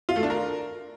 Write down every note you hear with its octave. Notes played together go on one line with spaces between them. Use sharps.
F4
A3
D4
A#4